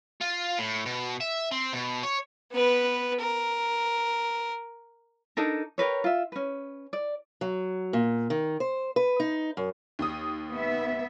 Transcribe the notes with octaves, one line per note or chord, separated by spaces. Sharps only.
F4
A2
B2
E5
C4
B2
C#5
B3 B4
A#4
D4 D#4 A4 A#4
G4 A#4 B4 C#5
F4 E5
C#4 B4
D5
F#3
A#2
D#3
C5
B4
D#4
F#2
D#2 D#6
B3 E5